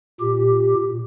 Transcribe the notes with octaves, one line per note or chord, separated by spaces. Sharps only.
A#2 G4